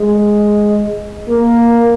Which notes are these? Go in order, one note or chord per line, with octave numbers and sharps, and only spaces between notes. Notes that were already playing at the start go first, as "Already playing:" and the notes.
Already playing: G#3
A#3